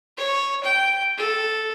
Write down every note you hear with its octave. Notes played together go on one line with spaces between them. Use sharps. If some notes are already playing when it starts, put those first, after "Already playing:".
C#5
G5
A4